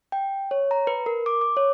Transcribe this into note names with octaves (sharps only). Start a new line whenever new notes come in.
G5
C#5
A#5
B4
A#4
D6
D6
C#5